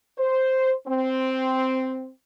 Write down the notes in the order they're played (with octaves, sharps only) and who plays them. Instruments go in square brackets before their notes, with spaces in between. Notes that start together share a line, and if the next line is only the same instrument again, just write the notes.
[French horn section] C5
C4